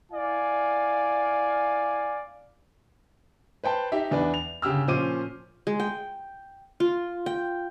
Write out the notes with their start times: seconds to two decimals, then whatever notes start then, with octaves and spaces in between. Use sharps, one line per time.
0.12 E4 D5 F5 G#5
3.64 B4 C5 G5 A5
3.92 D#4 G4 E5
4.11 E2 D4 E4 B4 D5
4.34 F7
4.62 G1 C#3 G4 E6 F6
4.87 A#2 F3 C#4 C5 D6 D#7
5.67 G#3
5.80 G5
6.80 F4
7.26 G5